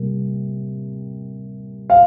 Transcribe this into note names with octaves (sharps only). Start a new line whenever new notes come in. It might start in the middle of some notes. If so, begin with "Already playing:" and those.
Already playing: C3 G3 A#3
F5